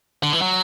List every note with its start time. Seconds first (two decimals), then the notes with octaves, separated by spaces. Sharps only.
0.23 D3
0.33 E3
0.42 F#3